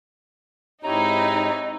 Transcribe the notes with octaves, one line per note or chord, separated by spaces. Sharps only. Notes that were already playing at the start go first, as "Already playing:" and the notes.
G#2 C4 D#4 E4 G4 C#5 A#5